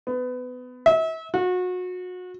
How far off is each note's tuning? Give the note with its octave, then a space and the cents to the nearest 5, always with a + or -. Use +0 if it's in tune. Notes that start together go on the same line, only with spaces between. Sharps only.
B3 +25
E5 -35
F#4 -30